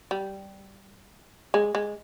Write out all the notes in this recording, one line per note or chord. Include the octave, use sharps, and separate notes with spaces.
G3
G#3
G#3